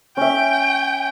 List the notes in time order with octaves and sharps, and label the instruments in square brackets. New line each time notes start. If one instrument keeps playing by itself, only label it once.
[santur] C#4 E5 [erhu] G5